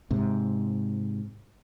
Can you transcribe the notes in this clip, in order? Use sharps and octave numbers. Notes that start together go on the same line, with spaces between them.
G#2 C3